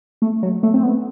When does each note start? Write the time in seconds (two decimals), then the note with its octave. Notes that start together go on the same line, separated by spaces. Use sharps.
0.22 A3
0.43 F#3
0.63 A3
0.74 C4
0.83 B3